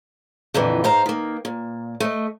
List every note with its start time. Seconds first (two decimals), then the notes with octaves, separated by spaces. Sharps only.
0.54 F2 A#2 D3 E3
0.84 G#2 C5 F5 A#5
1.06 D#3 A#3
1.45 A#2
2.00 A3 D#5